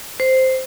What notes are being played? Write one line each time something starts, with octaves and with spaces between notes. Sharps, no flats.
C5